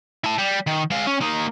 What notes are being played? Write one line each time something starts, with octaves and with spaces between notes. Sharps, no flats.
E4 A5
G3
D#3
G#3 F5
C#4
A#3 D#4